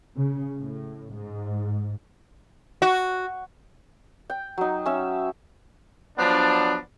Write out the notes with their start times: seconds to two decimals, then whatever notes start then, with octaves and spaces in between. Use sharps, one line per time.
0.15 C#3
0.58 A2
1.13 G#2
2.82 F#4
4.30 G5
4.58 F#3 D#4
4.86 C#4 E5
6.18 F3 F#3 B3 D4